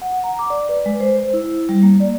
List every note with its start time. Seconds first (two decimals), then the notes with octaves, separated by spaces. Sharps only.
0.02 F#5
0.24 A#5
0.39 D6
0.50 D5
0.69 B4
0.86 G#3
1.00 C5
1.34 E4
1.69 G3
1.83 A#3
2.00 D5